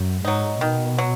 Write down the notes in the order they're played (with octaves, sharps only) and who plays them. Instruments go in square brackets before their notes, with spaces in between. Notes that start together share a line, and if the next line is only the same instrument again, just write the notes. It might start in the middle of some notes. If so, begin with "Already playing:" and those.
Already playing: [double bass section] F#2
[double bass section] G#2 [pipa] F#3 D#4
[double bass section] B2 [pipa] D#3
[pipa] F#3